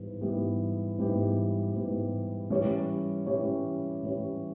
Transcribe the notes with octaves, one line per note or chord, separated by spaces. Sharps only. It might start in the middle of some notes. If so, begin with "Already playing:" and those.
Already playing: G#2 E3 G3 B3
G#2 E3 G3 B3 G4
G#2 E3 G3 B3 G4
G#2 E3 G3 B3 G4
E3 G3 C#4 G4 C#5
E3 G3 C#4 G4 C#5
E3 G3 C#4 G4 C#5